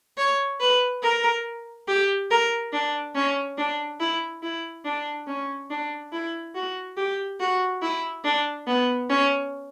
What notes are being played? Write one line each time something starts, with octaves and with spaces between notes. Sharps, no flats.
C#5
B4
A#4
G4
A#4
D4
C#4
D4
E4
E4
D4
C#4
D4
E4
F#4
G4
F#4
E4
D4
B3
C#4